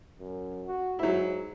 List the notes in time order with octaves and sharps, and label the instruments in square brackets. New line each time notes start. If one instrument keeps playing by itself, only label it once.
[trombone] F#2
F#4
[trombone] G#2 [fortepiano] F#3 E4